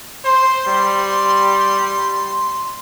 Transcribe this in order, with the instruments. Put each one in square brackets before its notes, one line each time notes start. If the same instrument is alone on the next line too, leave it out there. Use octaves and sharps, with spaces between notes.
[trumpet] C5 [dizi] C6
[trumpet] G3